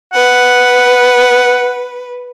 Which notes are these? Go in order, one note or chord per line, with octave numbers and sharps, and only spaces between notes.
B4 F#5